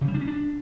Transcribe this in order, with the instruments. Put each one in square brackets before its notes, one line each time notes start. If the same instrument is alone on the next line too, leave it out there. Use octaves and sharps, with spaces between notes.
[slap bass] C#3
G3
D4
C#4
D4